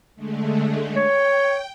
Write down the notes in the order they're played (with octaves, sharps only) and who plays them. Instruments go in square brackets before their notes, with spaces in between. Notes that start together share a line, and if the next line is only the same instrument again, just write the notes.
[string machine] D3 G#3 A3
[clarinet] C#5 [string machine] G5